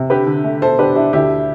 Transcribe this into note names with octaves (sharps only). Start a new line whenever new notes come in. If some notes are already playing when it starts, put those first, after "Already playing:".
Already playing: C3
D3 G4 B4
D3
A3
B2 A4 C5
D4 G4 B4
D4 E4 G4
D2 E4 G4